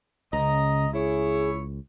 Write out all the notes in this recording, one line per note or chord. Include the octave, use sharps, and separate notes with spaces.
C#2 C#3 D#5 A#5
E4 G#4 C#5